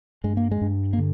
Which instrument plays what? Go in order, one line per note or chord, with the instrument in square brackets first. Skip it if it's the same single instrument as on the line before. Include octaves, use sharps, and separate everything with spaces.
[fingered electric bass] G2 G#3
A#3
G#3
G2
A#3
D3